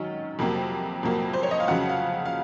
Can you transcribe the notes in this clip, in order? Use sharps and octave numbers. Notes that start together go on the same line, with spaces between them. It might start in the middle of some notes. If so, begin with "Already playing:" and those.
Already playing: D#3 F#3 C#4
F2 C3 F#3 A#3
F2 C3 F#3 A#3
C5
C#5
D#5
F5
F2 C#3 F#3 F#5
F5
F5